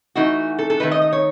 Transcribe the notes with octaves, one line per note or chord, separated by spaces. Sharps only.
E3 A3 D#4 F#4
A4
A4
D#3 A3 D#4 B4
D#5
D#5
C#5